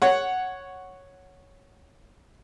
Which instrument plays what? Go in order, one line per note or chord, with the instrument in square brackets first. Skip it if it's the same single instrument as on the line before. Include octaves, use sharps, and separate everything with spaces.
[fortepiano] C#5 F#5